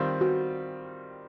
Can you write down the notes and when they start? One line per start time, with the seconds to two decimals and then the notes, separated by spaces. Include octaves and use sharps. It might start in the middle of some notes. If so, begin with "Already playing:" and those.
Already playing: D#3 G3 C4 F4
0.21 F#4